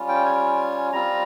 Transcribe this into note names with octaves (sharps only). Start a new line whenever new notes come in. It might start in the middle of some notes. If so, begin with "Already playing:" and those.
Already playing: G3 C#4 F4
G5
G#5
G3 C4 F4 A#5